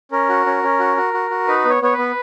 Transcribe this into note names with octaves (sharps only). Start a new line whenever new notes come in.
C#4 A#4
F#4
C#4
C#4
F#4
F#4
F#4
F#4
D#4 B4
B3
C#5
B3 C#5
B4
B3